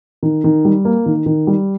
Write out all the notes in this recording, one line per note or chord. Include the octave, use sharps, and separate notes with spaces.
D#3
D#3
G3
A#3
D#3
D#3
G3